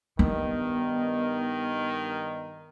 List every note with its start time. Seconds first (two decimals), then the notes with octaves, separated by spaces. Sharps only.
0.19 G2 D#3 B3